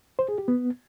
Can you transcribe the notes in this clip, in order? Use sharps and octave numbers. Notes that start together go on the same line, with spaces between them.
C5
G#4
G4
B3